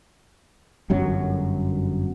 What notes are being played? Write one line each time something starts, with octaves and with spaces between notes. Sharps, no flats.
G1 F#2 F#3